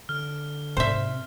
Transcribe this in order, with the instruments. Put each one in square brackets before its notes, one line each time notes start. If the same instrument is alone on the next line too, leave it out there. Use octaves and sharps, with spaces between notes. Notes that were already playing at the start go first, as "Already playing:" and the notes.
[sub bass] D3 [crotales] F6
[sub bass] G#2 [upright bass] C3 [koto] C5 E5